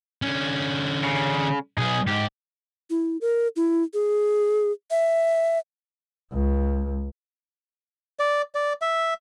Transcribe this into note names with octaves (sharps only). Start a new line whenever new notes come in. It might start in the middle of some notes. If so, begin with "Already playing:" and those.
D3 C#4
C#3
B1 B3 G#4
G#2 G4
E4
A#4
E4
G#4
E5
C#2
D5
D5
E5